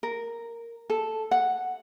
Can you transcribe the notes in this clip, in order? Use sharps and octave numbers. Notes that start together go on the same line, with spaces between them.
A#4
A4
F#5